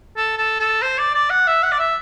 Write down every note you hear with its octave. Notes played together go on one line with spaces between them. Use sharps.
A4
A4
A4
C5
D5
D5
F#5
E5
F#5
D5
E5